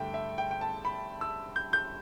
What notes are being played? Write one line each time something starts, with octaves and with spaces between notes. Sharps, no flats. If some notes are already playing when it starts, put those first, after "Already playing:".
Already playing: G2 D3 A3 E5 G5
E5
G5
G5
A5
B5
E6
G6
G6